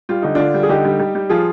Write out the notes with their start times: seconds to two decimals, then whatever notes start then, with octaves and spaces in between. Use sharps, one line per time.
0.09 G3 F4
0.22 D3 D#4
0.35 D3 D4 F4
0.54 G3
0.63 G#4
0.69 D3 D#4 G4
0.85 G3
0.99 G3
1.15 G3
1.30 F3 F4 G#4